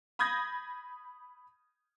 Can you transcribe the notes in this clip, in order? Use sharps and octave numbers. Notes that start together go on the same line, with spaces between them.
B5 D#6 G6 G#6 A#6